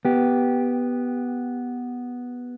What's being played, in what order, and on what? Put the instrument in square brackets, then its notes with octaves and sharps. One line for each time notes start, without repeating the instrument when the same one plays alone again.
[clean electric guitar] B3 G4